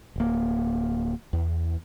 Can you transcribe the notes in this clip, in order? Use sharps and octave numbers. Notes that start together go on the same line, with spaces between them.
D1 A#3
E2